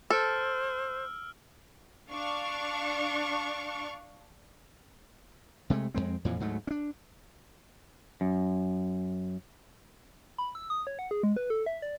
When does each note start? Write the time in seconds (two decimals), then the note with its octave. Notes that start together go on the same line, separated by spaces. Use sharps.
0.10 A4 C5 E6 F6 D7
2.11 D4 F5 C#6
5.70 C3 G#3 A3
5.94 F2 G#2 G#3 C4
6.25 F2 A#2 E3 F3
6.39 D2 G#2 F#3 A3
6.67 C#4 D4
8.21 F#2
10.38 B5
10.55 E6
10.70 D#6
10.87 C#5
10.99 F#5
11.11 G#4
11.23 G#3
11.36 B4
11.50 A4
11.66 E5
11.82 D5